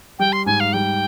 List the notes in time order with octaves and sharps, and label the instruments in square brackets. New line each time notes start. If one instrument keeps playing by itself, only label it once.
[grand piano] G3 [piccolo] G5
[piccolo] C6
[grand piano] G#2 [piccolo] G#5
[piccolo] F5
[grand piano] G3 [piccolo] G5